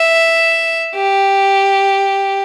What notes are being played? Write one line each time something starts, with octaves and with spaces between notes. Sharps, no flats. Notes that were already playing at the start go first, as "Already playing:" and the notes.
Already playing: E5
G4